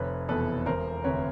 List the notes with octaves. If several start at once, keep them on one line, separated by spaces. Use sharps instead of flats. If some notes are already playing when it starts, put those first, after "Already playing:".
Already playing: F1 B4 C#5
E2 B2 A4 B4
E1 A#4 C5
D2 C3 B4 C#5